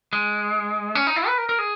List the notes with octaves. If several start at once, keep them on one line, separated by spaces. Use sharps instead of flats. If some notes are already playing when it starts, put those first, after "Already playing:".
G#3
C#4
D#4
E4
B4
A#4
A#4
G#4